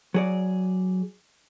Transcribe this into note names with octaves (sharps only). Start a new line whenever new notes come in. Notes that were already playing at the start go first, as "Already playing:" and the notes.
F#3 G#4 D5